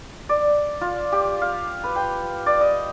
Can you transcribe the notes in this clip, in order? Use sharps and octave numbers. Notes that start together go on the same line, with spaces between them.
D5
F4
G4
F5
B4
G5
D5
D#5